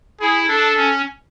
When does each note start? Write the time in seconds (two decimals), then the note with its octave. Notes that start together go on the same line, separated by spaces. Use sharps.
0.20 E4 G#4
0.48 D4 A4
0.76 C#4